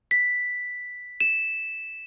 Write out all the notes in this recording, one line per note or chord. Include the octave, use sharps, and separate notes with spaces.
B6
E7